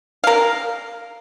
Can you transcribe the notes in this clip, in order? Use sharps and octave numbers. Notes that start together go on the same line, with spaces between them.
A#4 F5